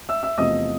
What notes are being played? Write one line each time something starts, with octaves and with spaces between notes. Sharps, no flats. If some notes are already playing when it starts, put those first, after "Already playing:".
E5 E6
E5 E6
E2 C3 F3 A3 D#5 D#6